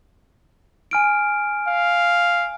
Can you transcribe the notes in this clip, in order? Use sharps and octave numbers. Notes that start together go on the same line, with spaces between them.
G#5 F6 D7
F5